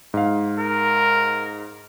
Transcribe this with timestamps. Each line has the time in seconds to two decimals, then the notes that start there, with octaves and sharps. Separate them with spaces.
0.14 G#2 F5
0.58 A#4